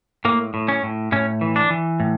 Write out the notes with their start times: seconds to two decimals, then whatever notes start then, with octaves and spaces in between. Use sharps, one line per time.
0.25 A2 A#3
0.54 A2
0.68 C#4
0.83 A2
1.12 A2 C#4
1.41 E3
1.56 D4
1.70 E3
2.00 A2